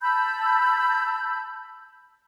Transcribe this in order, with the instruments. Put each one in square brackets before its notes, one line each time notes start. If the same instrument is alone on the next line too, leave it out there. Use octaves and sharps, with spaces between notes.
[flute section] A5 B5 E6 G6